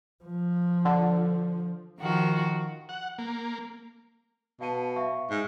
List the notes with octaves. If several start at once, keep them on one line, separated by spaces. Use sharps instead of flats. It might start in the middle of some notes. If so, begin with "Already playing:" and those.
F3
D3
D#3 F3 F#4
F#5
A#3
B2 F5 A5 D#7
E5 F5 C#6
G#2